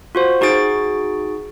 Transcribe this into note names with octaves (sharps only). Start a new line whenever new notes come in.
F4 F#4 C5
D#4 F#4 G#4 A6 D7